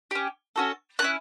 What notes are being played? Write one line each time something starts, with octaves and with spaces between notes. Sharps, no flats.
C#4 G4
C#4 F#4 A4
A3 C#4 E4 F#6